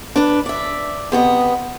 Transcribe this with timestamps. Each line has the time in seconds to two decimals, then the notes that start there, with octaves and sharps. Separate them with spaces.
0.16 D4 B4
0.46 D5 E5
1.12 C3 B3 D5 D#5